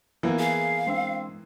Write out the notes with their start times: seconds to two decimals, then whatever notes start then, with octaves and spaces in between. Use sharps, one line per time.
0.23 E3 A#3 B3
0.39 G#4 F5
0.87 G#3 C4 D4 E6